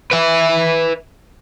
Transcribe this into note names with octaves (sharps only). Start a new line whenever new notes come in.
B4 E5